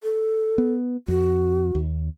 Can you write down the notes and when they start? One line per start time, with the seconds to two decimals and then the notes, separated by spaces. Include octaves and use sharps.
0.03 A4
0.58 B3
1.08 F2 F#4
1.75 D#2